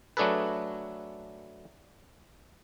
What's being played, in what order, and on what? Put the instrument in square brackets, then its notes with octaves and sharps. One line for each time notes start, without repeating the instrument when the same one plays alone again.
[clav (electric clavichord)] F#3 A3 D4 G#4 A4 B4